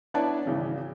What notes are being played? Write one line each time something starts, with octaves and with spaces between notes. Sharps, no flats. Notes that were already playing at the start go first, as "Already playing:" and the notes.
B3 D4 E4 C#5 D5 A5
G#1 C#3 E3